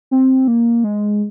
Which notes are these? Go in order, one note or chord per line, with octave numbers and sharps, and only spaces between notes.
C4
A#3
G#3